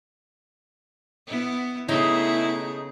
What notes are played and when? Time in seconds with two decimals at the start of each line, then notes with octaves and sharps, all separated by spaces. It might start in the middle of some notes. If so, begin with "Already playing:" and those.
1.27 B3 E4
1.88 C#3 A3 B3 D#4 E4 G#4